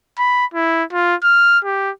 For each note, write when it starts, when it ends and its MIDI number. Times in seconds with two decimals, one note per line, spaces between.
0.18 0.45 83
0.54 0.83 64
0.92 1.15 65
1.23 1.59 89
1.64 1.91 67